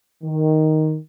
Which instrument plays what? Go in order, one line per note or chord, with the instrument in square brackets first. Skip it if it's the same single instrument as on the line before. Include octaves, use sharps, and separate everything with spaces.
[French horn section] D#3